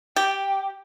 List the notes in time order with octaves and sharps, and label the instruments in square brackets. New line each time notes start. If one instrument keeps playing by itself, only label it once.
[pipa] G4 [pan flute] G5